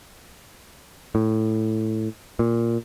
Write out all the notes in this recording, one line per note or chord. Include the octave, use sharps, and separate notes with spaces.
A2
A#2